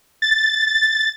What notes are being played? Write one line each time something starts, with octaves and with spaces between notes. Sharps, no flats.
A6
A6